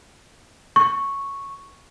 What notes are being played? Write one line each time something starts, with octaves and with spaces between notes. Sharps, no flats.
C#6